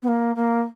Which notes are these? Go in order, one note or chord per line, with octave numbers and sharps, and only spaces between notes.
B3
A#3
A#3